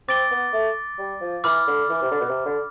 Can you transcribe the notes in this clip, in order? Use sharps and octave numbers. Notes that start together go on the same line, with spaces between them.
C4 D6 A6 D7 G7
B3
A3
G3
F3
E3 B5 D6 F6
D3
E3
C3
D3
B2
C3
D3